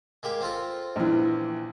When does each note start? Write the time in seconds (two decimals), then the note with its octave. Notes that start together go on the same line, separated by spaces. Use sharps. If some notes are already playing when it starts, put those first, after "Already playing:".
0.23 G#3 A#3 G4
0.41 C4 F4 A4
0.96 A#1 E3